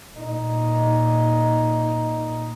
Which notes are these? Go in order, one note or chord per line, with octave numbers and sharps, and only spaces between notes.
A#2 D#4